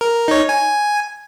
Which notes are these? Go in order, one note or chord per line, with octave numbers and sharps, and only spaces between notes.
A#4
D#4 C#5
G#5